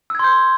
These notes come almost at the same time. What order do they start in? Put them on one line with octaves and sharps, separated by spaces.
E6 G#6 C6 G6